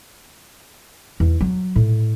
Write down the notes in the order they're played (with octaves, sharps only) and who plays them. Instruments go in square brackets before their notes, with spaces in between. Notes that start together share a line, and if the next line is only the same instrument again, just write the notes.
[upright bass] E2
F#3
A2